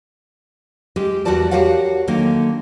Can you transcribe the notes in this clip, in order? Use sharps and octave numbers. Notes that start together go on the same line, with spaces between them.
G3 G#3 G4
E2 G3 F#4 A#4 D5 A5
F#4 G4 A#4 C#5 F5 F#5
D3 D#3 F#3 A#3